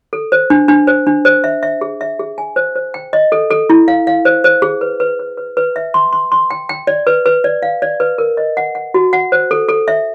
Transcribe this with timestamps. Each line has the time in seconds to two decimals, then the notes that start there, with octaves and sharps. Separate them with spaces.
0.13 A4
0.32 C5
0.50 D4
0.68 D4
0.87 C5
1.07 D4
1.25 C5
1.44 E5
1.63 E5
1.81 G#4
2.01 E5
2.20 G#4
2.38 G#5
2.56 C5
2.76 C5
2.94 G5
3.13 D#5
3.32 A4
3.51 A4
3.70 E4
3.88 F5
4.07 F5
4.25 C5
4.44 C5
4.62 G#4
4.81 B4
5.00 B4
5.19 B4
5.38 B4
5.57 B4
5.76 E5
5.94 C6
6.13 C6
6.32 C6
6.51 G5
6.69 G5
6.87 D5
7.07 B4
7.26 B4
7.44 D5
7.62 F5
7.82 D5
8.00 B4
8.18 A#4
8.37 D#5
8.57 F#5
8.75 F#5
8.94 F#4
9.13 F#5
9.32 C5
9.51 A4
9.69 A4
9.88 E5